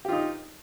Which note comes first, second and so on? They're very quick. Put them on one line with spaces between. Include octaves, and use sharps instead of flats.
G4 F4 D#4